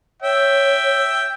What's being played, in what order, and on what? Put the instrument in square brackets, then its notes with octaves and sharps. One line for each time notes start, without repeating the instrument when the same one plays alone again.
[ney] C#5 [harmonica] E5 G5